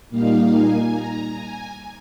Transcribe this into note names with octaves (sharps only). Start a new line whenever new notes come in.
A#2 G3 A#3 D#4 F5
G#5
A#5
G#5